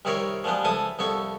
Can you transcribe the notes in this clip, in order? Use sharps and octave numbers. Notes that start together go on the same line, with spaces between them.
C2 C3 D#3 E4 A#4 C#5
F3 G3 G#3 B3 D4
C#2 F3 E4 A4 A5 D#6
C2 F2 B3 E4 A4 C#6